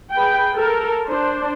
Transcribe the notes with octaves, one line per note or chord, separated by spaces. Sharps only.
G#4 B4 G5
A4 A#4
D4 C5